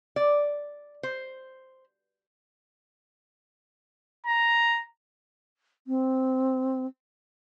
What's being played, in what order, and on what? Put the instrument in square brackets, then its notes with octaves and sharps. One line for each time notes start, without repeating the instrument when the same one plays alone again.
[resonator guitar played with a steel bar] D5
C5
[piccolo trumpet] A#5
[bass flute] C4